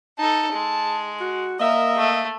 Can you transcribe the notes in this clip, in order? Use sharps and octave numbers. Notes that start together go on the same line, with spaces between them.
D#4 A4 A5
G#3
F#4
A#3 A#4 D#5 E5
A3